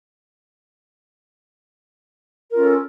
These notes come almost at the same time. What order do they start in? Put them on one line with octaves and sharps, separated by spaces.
A#4 F4 C#4 A4